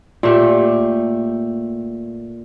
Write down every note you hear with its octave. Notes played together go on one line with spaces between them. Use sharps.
A#2 A3 G4